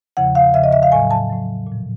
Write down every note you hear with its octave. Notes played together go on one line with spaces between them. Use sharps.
E2 C#3 F3 F#5
F5
E2 C#3 F3 E5
D#5
E5
F5
A2 F#3 G#5
A5
A2 F#3
A#2 F3